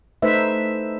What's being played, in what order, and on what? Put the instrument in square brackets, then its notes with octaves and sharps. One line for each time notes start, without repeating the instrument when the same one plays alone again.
[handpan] A3 D#4 B4 C5 E5